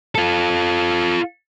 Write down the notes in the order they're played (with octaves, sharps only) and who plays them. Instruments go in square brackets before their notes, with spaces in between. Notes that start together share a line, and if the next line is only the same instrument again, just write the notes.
[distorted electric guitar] F4 A4